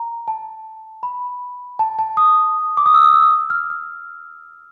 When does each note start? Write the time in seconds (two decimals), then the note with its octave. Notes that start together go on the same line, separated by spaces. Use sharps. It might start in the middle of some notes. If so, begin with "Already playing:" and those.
Already playing: A#5
0.28 A5
1.03 B5
1.79 A5
1.99 A5
2.17 D#6
2.77 D6
2.86 D#6
2.94 E6
3.04 D#6
3.13 E6
3.22 D#6
3.32 E6
3.50 F6
3.70 F6